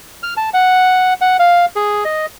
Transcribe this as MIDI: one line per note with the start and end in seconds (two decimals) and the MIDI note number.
0.23 0.34 89
0.37 0.50 81
0.54 1.14 78
1.21 1.37 78
1.39 1.65 77
1.76 2.04 68
2.05 2.26 75